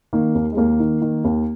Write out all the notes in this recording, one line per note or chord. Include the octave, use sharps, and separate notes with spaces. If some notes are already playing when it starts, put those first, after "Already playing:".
D#3 A#3
D#2
G#3
D#2 A#3
D#3
D#3
D#2